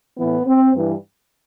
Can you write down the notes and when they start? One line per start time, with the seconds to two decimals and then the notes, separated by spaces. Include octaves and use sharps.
0.17 A2 E3 B3
0.45 C4
0.73 G2 E3